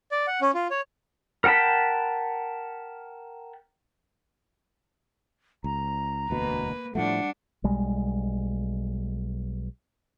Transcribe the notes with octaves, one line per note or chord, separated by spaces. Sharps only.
D5
F#5
C#4
F4
C#5
A#4 F#5 G5 A5 B5
C#2 A#5
E1 D2 B2 A#3 B4
A2 F3 G3 A3 D4 F#5
B1 G3 G#3